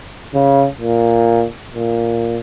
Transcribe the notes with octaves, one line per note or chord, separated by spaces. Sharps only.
C#3
A#2
A#2